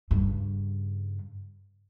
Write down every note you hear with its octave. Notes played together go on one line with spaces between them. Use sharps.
G2 C#3